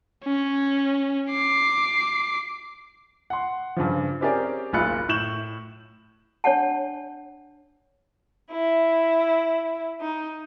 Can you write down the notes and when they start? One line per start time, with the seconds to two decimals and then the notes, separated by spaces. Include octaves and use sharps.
0.24 C#4
1.31 D6 C7
3.30 F#5 C6
3.76 G2 C#3 F3
4.21 C4 C#4 G4 G#4 A#4 D5
4.73 F#1 B1 F4 B5 F#6 C#7
5.09 A2 C#6 G6 E7 F#7
6.44 D4 C#5 D5 F#5 A5
8.51 E4
10.00 D#4